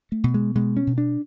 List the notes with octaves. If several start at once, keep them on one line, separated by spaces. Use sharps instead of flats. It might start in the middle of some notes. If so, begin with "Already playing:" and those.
A3
B2
G#3
B2 G#3
C#4
B2
D4